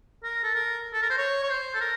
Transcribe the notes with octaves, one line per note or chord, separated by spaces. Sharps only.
A#4
A4
A#4
A4
A#4
C5
C#5
C#5
C5
A4
A#4